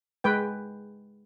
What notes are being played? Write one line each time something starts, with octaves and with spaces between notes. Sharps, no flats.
G#3 B4 G5